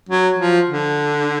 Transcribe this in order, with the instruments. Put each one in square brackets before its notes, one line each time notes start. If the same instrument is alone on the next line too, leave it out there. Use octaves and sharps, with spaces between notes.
[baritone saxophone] F#3
F3
D3